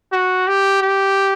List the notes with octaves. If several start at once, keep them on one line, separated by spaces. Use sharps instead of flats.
F#4
G4
G4